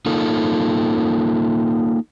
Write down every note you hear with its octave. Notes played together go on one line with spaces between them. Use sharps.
A#3 D#4 F4 A4